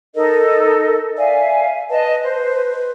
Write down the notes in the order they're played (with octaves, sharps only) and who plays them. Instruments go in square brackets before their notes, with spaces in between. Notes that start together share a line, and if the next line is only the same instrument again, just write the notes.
[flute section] D#4 A4 D#5 [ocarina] A#4
[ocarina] D5 [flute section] E5 F5 G#5
[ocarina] B4 [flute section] D#5 A5
[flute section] C5